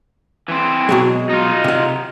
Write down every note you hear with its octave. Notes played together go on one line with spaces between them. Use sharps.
E3 C4
B2 F#3 G#3
D#4 F4
C3 F#5